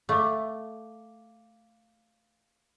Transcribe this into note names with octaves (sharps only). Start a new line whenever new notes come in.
A3 F5 D6